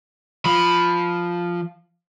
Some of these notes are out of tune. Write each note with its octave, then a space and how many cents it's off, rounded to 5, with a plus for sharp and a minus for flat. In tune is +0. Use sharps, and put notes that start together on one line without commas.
F3 +0 B5 +0